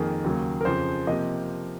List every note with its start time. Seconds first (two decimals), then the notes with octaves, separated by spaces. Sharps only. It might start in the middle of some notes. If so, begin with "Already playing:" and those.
Already playing: F2 D#3 A#3 G#4
0.24 D#2 C#3 F#3 A#3
0.61 A#4
0.65 F2 C#3 F3 C5
1.07 C3 F3 A#3 D#5